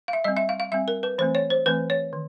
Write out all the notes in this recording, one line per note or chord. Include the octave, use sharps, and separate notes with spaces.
F5
E5
G3 C4 D#5
E5
F5
F5
G3 C4 E5
A#4
B4
E3 A3 C4 C5
C#5
C5
E3 A3 C4 B4
C#5
D#3